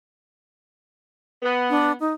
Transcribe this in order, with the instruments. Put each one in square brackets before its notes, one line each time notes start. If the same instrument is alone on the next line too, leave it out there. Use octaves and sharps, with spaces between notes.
[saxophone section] B3
[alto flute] D4
D#4